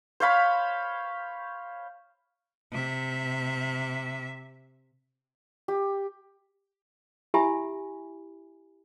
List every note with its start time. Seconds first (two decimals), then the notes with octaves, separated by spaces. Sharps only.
0.20 C5 C#5 F5 B5
2.72 C3 E5
5.68 G4
7.34 E4 G4 E5 G#5 B5